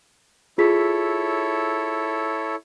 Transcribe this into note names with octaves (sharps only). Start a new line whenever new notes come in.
E4 F4 G#4 A4 C#5 B6